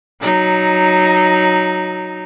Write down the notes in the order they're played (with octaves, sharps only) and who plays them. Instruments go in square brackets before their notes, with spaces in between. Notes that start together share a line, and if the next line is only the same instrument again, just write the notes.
[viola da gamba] F#3 D#4